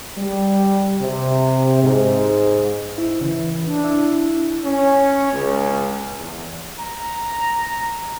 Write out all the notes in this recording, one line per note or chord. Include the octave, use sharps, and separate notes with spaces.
G3
C3
G#2
E4
C#3 E3
D4
E4
C#4
C#2
E2
A#5